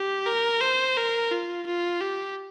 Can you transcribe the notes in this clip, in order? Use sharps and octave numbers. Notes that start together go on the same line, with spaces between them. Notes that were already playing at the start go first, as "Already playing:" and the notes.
Already playing: G4
A#4
C5
A#4
F4
F4
G4